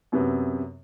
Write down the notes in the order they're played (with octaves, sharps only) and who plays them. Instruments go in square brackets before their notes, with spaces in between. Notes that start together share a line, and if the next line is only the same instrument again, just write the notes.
[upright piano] F#2 C3 B3